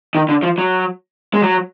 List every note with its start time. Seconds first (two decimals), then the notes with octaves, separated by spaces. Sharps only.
0.15 D#3
0.29 D3
0.43 F3
0.58 F#3
1.34 G#3
1.43 F#3